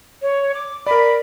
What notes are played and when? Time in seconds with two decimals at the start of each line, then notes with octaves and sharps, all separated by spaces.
0.22 C#5
0.54 D6
0.87 A#4 D5 B5